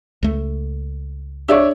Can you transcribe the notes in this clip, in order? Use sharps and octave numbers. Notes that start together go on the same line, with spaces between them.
C#2 A3
D4 G4 G#4 C#5 D5 E5 F5